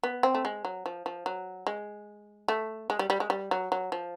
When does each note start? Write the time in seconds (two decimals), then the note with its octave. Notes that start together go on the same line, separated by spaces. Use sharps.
0.03 B3
0.23 C4
0.35 A3
0.45 G#3
0.65 F#3
0.86 F3
1.06 F3
1.26 F#3
1.67 G#3
2.48 A3
2.90 G#3
2.99 G3
3.10 G3
3.20 G#3
3.30 G3
3.51 F#3
3.72 F#3
3.92 F3